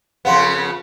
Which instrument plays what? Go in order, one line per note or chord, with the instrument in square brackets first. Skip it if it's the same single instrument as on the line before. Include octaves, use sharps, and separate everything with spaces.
[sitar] F2 C#3 B3 [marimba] F5 F#5 C6